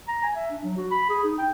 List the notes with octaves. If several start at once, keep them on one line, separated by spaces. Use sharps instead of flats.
A#5
G#5
E5
D4
F#3
F#4
B5
G#4
D#4
G5